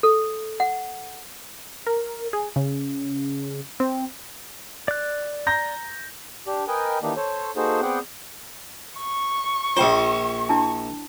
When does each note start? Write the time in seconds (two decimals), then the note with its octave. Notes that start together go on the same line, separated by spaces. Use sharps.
0.03 A4
0.60 F#5
1.87 A#4
2.33 G#4
2.56 C#3
3.80 C4
4.88 D5 F#6
5.47 A#5 G6 A#6
6.47 D4 G4
6.68 A#4 B4 D#5 G5 G#5
7.02 D#3 E3 A#3 D4 D#4 G4
7.17 A4 C5 C#5
7.56 A#3 D#4 F#4 G#4 A4 C5
7.82 B3 C4 G#4 D5 F#5 G5
8.98 C#6
9.77 A#1 F4 C5 G5
10.49 D4 E4 A5